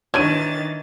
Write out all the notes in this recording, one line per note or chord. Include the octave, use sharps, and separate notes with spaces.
D#3 E3 D4 C#5 G#6 A6 D#7